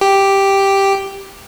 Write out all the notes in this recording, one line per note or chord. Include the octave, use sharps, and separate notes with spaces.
G4